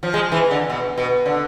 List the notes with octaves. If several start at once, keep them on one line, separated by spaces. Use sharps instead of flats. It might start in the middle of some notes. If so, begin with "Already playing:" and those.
F3
G#3
E3
D3
B2
B2
D3